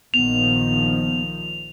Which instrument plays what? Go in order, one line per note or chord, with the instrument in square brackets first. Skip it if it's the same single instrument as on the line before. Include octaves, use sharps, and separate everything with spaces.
[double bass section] A#1 D#3 F3 [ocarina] B3 [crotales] F7